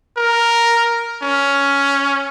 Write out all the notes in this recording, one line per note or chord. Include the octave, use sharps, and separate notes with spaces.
A#4
C#4